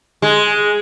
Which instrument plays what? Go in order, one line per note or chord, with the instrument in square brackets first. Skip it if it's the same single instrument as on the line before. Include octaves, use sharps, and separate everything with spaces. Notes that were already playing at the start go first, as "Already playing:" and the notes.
[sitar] G#3